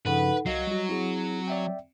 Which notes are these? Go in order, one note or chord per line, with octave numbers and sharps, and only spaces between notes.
G2 C#3 F3 D#4 A4 B4 F#5
C2 F#3 D#5 F5 C7
G3 F#4
C4 E4 F#4 G#4
D5 E5 G5